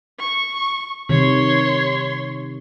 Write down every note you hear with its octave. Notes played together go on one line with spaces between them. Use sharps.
C#6
C3 D#3 C#5 C6